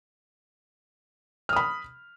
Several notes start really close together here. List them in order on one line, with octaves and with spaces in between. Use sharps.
F6 D#6 B5